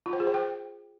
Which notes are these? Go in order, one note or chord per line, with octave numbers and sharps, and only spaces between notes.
F4
C5
G#4
C5
G5